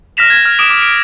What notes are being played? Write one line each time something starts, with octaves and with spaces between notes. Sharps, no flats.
F6 F#6 A#6 B6 E7 F7
G#6
F6
D6 D#6 D7 E7
D6
D7